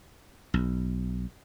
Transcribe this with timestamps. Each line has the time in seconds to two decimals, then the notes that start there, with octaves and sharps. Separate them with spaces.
0.54 B1